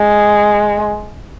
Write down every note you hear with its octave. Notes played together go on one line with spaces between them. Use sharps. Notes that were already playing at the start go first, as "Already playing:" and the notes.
Already playing: G#3